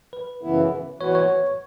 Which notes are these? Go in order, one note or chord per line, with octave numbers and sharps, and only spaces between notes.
B4
F#2 C#3 E3 B3 E4
E3 B3 F#4 B4 C#5
C#5